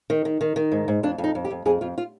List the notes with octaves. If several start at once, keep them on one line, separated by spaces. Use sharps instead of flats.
D#3
D#3
D#3
D#3
G#2
G#2
F2 D4
F2
D#4
F2
G4
F2
F2 G#4
F2 F4
F4